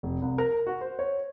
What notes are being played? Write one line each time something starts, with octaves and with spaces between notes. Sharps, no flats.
F1
C2
A#4
F#4
C5
C#5